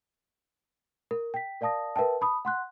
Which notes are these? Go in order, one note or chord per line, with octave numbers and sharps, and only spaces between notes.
A#4
G5 B6
A#4 D5 F5 A5 D#6 A#6
A#4 B4 E5 G5 A5
A5 B5 D#6
F#5 C6 F#6